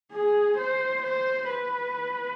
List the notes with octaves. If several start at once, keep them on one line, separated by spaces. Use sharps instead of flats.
G#4
C5
C5
B4